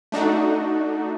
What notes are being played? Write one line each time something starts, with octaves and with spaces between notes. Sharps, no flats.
A3 D4 D#4 F#4